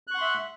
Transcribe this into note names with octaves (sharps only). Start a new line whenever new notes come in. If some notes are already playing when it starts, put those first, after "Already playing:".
E5 F#5 C6 C#6 F#6